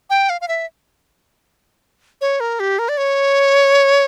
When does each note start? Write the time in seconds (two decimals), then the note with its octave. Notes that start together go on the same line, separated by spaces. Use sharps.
0.10 G5
0.30 F5
0.41 F5
0.48 E5
2.21 C#5
2.40 A#4
2.60 G4
2.79 A#4
2.89 D5
2.97 C#5